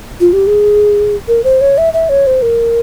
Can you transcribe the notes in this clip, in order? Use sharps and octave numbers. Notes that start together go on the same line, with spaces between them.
F4
G4
G#4
A#4
C5
C#5
E5
E5
C#5
C5
A#4